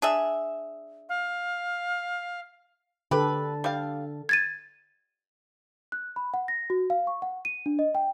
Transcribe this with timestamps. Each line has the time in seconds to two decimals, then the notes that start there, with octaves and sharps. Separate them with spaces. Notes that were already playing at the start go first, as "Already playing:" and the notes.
0.02 D4 G#4 E5
1.09 F5
3.11 D3 G4 A4 B4
3.64 G3 F5
4.29 G#6 A6 D#7
5.92 F#6
6.16 B5
6.34 F#5
6.48 A#6
6.70 F#4
6.90 F5
7.07 C#6
7.22 F#5
7.45 D#7
7.66 D4
7.79 D#5
7.95 G5